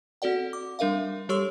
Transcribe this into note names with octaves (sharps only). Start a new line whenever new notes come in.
C4 F#4 A4 D5 F#5
D6
G3 D4 A#4 E5 F5
G3 G4 A4 C#5 C#6 E6